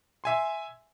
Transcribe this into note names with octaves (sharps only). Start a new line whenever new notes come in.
E5 G#5 C6